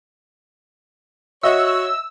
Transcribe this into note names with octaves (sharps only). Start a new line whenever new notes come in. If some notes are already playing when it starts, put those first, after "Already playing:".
F#4 C#5 D#5 E5 E6